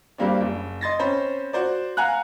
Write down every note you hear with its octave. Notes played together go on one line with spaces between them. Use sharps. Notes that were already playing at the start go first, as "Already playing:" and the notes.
G2 G3 A#3 C4 D4
F#1
D#5 C6 A6 A#6
C4 C#4 C5 B5
F#4 C5 D5
F5 F#5 G#5 A#5 F#6